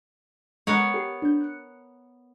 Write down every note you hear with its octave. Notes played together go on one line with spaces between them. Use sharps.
G#3 B3 A#4 C#5
G4 C7
D4 G6
F#6 C#7